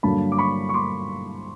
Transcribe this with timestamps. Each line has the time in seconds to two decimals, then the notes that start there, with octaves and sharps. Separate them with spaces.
0.03 G2 D3 F#3 A#3 A5 B5
0.32 D6
0.38 B5 C#6
0.69 C#6
0.74 C6 D6